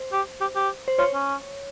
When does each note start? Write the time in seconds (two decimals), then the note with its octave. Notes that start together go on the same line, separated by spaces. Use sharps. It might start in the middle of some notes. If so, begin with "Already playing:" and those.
Already playing: C5
0.12 G4
0.41 G4
0.56 G4
0.88 C5
0.99 F4 C#5
1.14 C#4